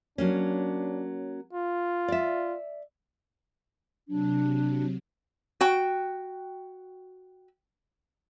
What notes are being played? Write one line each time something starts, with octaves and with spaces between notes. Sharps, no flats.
F#3 A#3 C#4 D4
F4
D5 E5
C3 F#3 D4
F#4 G5